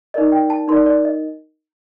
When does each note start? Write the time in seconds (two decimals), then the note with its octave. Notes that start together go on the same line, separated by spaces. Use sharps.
0.14 D#4 A#4 D5 D#5
0.32 G5
0.50 A5
0.68 D#4 A#4 D5 C6
0.86 D5
1.05 D#5